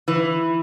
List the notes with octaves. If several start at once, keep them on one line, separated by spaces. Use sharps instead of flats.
E3